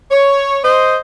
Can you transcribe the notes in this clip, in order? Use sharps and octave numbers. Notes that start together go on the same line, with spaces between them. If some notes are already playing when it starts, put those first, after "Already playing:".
C#5
C5 D#5